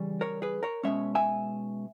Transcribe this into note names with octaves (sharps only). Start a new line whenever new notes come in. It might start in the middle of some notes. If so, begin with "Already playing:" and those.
Already playing: C#3 E3 G3 C#4
A#4 C#5
G#4 B4
A#4 C#5
B2 G#3 C#4 C#5 E5
E5 G#5